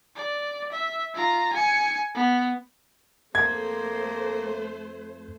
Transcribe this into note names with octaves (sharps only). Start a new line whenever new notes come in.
D5
E5
F4 A#5
G#5 C#7
B3
F2 A3 A#3 C5 G#6